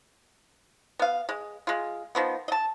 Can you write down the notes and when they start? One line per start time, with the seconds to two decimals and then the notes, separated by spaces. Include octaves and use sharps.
0.99 B3 F5
1.29 G#3
1.67 G#3 F4
2.15 D#3 F3 B3
2.48 D#5 A5